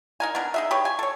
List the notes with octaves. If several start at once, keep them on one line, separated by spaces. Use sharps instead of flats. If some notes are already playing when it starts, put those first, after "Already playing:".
D#4 A#4 G#5
B3 D4 A#4
D#4 G#4 E5
G4 B4 C#5
G#5
A4 C#5